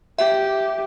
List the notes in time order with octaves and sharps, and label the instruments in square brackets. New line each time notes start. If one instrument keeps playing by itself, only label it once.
[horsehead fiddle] G4 [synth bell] E5